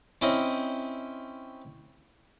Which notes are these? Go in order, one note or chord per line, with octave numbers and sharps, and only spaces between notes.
C4 C#4 E4 D#5